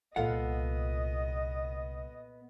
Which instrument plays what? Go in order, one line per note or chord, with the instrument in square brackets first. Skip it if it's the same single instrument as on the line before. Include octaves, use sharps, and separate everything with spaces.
[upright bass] C2 [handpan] A#2 A4 F5 [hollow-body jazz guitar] B3 F4 F#5 [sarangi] D#5